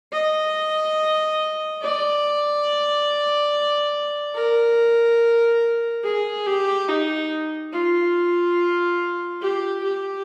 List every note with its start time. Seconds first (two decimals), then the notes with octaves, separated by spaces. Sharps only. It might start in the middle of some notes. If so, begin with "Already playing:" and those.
0.12 D#5
1.81 D5
4.35 A#4
6.04 G#4
6.46 G4
6.88 D#4
7.73 F4
9.41 G4
9.83 G4